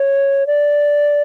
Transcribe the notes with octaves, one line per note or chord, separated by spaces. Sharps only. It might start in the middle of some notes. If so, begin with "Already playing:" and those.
Already playing: C#5
D5